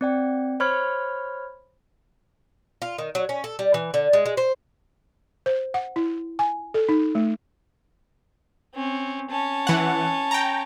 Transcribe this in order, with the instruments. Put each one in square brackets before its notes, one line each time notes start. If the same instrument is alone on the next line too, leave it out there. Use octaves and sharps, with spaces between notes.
[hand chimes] C4 D5 G5
C5 C#5 B5 C#6 F6 G#6
[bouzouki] F4
D#3
F#3
C#4
A4
G3
E3
D3
G#3
G#3
C5
[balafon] C5
F#5
E4
G#5
A4
D#4
A3
[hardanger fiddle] C4 C#4
C#4 A5
[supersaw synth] E3 F#5
G5 A#5